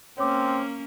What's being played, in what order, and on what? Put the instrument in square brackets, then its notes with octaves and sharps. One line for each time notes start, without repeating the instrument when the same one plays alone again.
[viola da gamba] A#3 C#4 [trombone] C4 [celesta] C#5 D6